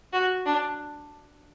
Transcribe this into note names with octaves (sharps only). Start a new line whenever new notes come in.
F#4
D4